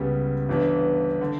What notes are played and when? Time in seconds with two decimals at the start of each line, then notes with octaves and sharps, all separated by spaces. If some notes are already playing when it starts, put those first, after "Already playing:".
Already playing: C#2 C#3 G3 B3
0.49 G1 G2 E3 B3 D4
1.21 D3